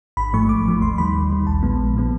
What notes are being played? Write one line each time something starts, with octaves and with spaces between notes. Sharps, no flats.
G#1 B5
G#2 F3 A3 C#6
G#1 D6
G#2 F3 A3
D#2 C6
D#3 G3 B5
D#2
D#3 G3
A#1 A5
A#2 F3 G#3 B3
A#1
A#2 F3 G#3 B3